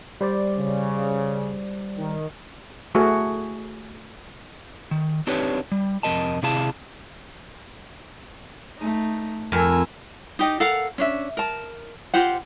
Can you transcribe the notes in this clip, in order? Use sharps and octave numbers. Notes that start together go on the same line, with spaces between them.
G3 C5 D5
C#3
D#3
A3 F#4 G#4
D#3
C4 D4 D#4 G4 B4 C#5
G3
F2 C3 A#4 D#5 A5
C3 E4 G#4 F5 A5
A3 D#4
F2 A#4 G#5 E6
D#4 G4 D#5
A4 A#4 F5 F#5
C#4 D4 E5
A#4 A5
F4 G4 C5 F#5